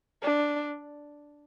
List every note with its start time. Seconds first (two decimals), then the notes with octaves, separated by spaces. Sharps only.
0.23 D4